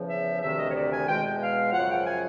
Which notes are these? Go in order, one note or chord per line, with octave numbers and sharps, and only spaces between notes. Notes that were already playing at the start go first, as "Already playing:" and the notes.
Already playing: E2 C#3 F3
E5
D2 C3 D#3 E5
D#5
C#5
D5
G#5
E2 B2 G#3 G5
F5
F#2 C#3 F3 F#5
G5
G#5